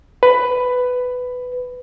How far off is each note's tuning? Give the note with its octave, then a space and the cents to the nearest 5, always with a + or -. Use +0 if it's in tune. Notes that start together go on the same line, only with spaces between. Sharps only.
B4 +10